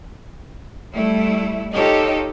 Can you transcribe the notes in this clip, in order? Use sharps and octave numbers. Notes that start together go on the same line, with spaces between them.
G3 A3 E4
D#4 F4 G4 A4 C#5 D#5